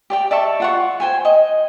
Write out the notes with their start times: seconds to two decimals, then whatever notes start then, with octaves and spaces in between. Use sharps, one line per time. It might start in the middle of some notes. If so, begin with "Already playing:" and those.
0.10 G4 D5 G5
0.31 D5 E5 A5 C#6
0.60 F4 F#5 C#6
1.00 C5 G5 G#5
1.25 D#5